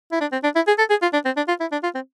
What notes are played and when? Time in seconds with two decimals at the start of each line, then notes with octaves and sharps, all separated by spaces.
0.12 E4
0.21 D4
0.32 C4
0.43 D4
0.55 E4
0.67 G#4
0.78 A4
0.90 G#4
1.02 F4
1.13 D4
1.25 C4
1.37 D4
1.48 F4
1.60 E4
1.72 D4
1.83 F4
1.95 C4